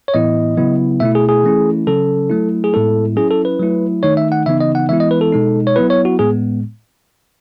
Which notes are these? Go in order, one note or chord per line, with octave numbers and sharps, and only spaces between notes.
C#5
A2 E3 B3 E4 D#5
C#3 F#3 B3 E4
B2 A3 E4 E5
G#4
G#4
E3 A3 C#4 E4
C#3 F#3 C#4 A4
F#3 A3 E4
G#4
A2 G#3 B3 E4 A4
F#3 C#4 E4 G#4
A4
B4
F#3 A3 E4
D#3 A3 D#4 C#5
E5
F#5
C#3 E3 B3 D#4 E5
D#5
F#5
E3 G#3 B3 E4 E5
D#5
B4
A4
B2 G#3 D#4
C#5
F#3 B3 E4 B4
C#5
F#4
A2 G#3 B3 G#4